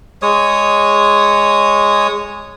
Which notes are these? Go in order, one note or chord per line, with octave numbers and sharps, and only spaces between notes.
G#3 C#5 D#6